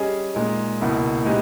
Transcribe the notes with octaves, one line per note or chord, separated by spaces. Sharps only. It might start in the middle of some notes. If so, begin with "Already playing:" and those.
Already playing: G3 C#4 G#4 D#5
A#2 G#3 D#4
C#2 B2 A#3 E4
A#2 G#3 B3 D#4 G4